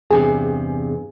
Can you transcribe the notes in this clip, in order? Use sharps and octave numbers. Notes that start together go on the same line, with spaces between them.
E2 G2 C3 G#4